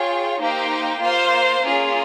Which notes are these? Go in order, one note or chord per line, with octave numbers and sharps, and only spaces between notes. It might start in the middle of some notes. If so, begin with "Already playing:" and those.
Already playing: F4 G#4 C#5 G5
A#3 D#4 G4 C5 G5
A#3 F4 C5 F5
A#3 C#4 F4 G#4